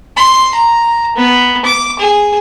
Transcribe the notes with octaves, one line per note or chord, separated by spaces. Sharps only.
C6
A#5
B3
D6
G#4